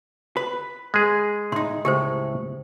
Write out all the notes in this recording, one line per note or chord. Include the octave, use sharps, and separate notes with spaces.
B4
G#3 G#4
A2 D#4 C6
C#2 A2 G4 C5